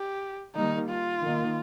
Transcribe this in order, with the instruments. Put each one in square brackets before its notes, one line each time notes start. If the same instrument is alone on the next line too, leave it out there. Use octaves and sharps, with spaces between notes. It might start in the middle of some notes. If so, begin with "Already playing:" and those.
Already playing: [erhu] G4
[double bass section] D#3 G3 A#3 [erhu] D#4
[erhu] F4
[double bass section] D#3 A#3